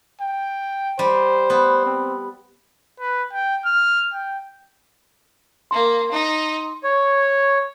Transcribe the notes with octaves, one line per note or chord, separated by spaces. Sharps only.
G5
G3 C5
B3
C4
B4
G5
F6
G5
A#3 C6
D#4
C#5